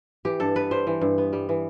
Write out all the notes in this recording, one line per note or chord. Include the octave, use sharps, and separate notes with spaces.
E3 G4
G2 A4
B3 B4
G3 C5
E3
G2
B3
G3
E3